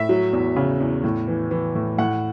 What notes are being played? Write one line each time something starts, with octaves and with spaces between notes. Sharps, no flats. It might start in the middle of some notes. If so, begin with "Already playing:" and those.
Already playing: A2 E5
F#3
E2
C#3
E2
A2
E3
E3
A2
A2 F#5